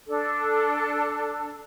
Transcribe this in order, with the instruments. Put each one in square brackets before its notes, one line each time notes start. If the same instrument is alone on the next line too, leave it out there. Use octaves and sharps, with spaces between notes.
[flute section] D4 A4